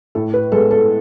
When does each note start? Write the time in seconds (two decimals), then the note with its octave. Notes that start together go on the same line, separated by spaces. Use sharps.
0.15 A2 A4
0.34 B4
0.52 G#3 B3 A4
0.71 A4